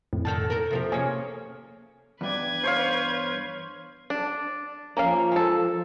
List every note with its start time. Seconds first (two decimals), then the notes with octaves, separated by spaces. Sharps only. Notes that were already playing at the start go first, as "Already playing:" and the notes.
0.13 F2 A2
0.25 E2 D#3 A4 A5 G6
0.50 A4 A#4
0.71 C3 F3 G4
0.92 A#3 C#4 G#4 C#5
2.21 E2 G2 B4 D5 G#6
2.64 C5 C#5 F5
4.10 D4
4.97 F3 A#3 C#4 F5
5.32 G#3 A4